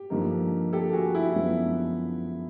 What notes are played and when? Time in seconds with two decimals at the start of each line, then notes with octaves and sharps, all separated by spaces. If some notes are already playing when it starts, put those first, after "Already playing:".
Already playing: G4
0.10 G2 D3 F3 A#3 D#4
0.73 G4 A4
0.93 F#4 G#4
1.15 E4
1.35 F#2 D3 F3 G#3 B3